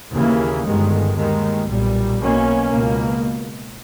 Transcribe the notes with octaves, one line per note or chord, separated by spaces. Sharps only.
D#2 C#3 E3 A#3
G1 G2 D#3 G#3
D#2 D#3 G#3
B1 A#2 G3
B1 B2 A#3 C#4
C#2 B2 A#3